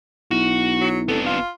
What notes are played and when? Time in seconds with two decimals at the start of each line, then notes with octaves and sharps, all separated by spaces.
0.31 B1 E4 F#4
0.81 F#3
1.08 F1 B3 D4 A4
1.26 F4